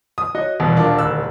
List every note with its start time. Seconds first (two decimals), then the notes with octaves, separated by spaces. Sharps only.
0.18 D#6
0.35 F#4 C#5 D#5
0.60 D#1 B2 E3 G3 B3
0.76 D#2 D4 F4 A#4
0.97 D1 E6 F#6